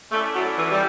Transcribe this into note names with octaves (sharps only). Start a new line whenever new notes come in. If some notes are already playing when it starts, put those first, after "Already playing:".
A3 C#4 E4 A4 D5
F#3
E3
G3